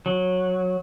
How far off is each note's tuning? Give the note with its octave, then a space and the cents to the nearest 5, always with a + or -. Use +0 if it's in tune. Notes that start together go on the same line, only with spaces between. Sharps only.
F#3 -15